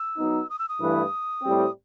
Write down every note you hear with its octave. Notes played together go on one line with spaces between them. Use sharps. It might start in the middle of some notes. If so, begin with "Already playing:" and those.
Already playing: E6
F#3 B3 D#4
D#6
E6
D#6
G2 E3 A3 E4 B4
A2 G3 C4